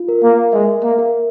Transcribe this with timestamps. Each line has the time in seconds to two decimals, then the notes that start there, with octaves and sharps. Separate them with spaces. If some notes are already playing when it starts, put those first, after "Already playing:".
Already playing: F4
0.08 A#4
0.23 A#3
0.53 G#3 E5
0.83 A#3
0.99 A#4